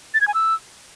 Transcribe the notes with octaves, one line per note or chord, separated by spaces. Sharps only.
A6
G#6
G#5
E6